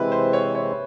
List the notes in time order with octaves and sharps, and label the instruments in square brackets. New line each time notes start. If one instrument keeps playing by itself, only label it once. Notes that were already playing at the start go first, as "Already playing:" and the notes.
Already playing: [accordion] C3 E3 G#3 C4 E4 [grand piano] B4
[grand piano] C5
C#5
C#5